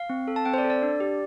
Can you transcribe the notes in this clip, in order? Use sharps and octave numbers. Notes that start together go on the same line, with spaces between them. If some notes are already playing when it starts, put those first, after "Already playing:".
Already playing: F5
C4
A4
A5
C4 G5
C5
D5
A4
D5
D4
G4